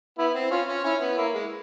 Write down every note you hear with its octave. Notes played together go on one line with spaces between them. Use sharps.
B3 E4
C4
C#4 F4
C#4
C#4 E4
B3
A#3 E4
G#3